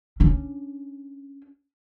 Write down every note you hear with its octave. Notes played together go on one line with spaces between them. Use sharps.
C#4 D4